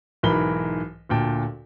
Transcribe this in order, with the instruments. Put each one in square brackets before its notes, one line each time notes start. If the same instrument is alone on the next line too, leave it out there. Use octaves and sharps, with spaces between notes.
[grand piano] B1 G#2 E3 A#4 B5 G7
D2 A#2 G5 A5